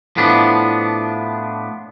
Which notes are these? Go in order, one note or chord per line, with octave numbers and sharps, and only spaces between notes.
A2 F3 B3 D4